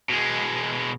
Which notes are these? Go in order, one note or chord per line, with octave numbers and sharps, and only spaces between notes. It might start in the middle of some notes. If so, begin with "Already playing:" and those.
B2 G#3